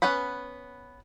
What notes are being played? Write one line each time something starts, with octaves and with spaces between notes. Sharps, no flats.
B3 C#4 B4 F#5 B5